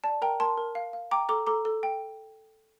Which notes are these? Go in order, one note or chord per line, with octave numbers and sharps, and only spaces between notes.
D5 A5
A#4 G5 A#5
A#4 A5 C6
A#4
F5
F5
G5 A#5 D6
A4 A#5 D6
A4 A#5 D6
A4
G5